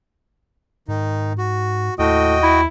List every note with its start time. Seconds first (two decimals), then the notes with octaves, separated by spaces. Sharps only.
0.88 G#2 D#3 D#4
1.38 F#4
1.99 D#2 A2 F#4 D#5 G5
2.43 E4